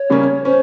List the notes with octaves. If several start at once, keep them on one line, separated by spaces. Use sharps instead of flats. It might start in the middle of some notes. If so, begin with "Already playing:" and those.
Already playing: C#5
C#3 G3 A#3 C#4
C#4 C5